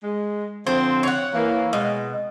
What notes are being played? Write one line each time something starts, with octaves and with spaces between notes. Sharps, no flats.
G#3
D3 F3 C4 C5
C#5 F#5
E3 A#3
B2 G#3